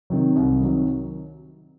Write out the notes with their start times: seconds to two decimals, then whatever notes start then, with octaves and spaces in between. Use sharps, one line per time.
0.10 C3 D#3 F#3
0.36 C2
0.61 C3 D#3 F#3